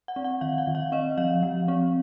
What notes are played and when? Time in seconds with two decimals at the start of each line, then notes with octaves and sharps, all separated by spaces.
0.08 F#5
0.16 C4
0.24 F#5
0.41 D#3 F5
0.58 F#5
0.67 D#3
0.75 F5
0.92 C4 D#5
1.18 F3 F5
1.43 F3
1.68 C4